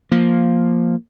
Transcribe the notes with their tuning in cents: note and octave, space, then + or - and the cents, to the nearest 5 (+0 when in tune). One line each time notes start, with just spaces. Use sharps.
F3 +0 A#3 +0